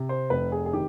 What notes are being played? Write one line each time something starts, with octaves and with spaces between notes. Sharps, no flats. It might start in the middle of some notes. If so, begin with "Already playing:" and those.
Already playing: C3
C5
F1 B4
G#4
G#4
D#3 G4